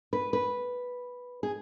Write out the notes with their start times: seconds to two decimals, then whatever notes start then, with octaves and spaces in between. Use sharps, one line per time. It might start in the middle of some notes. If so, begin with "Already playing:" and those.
0.13 B4
0.33 B4
1.43 G#4